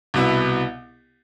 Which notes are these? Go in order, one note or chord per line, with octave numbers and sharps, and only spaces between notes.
C2 B2 B3 E4